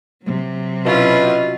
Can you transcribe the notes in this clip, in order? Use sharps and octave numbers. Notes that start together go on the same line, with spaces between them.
C3 F#3
B2 C#4 E4 F4